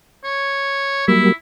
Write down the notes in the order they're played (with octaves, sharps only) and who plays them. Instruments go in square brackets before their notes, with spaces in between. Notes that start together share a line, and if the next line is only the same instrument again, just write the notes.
[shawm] C#5
[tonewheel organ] F#3 G3 A#3 [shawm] E4